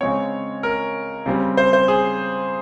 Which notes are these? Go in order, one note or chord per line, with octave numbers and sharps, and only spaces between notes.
C#3 G#3 C4 C#5
A#4
C#3 G3 C4
C5
C5
G#4